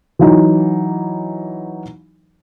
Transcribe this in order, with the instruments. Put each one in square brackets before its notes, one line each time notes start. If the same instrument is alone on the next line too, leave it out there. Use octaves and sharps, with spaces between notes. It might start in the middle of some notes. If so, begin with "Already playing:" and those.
[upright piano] E3 F#3 D#4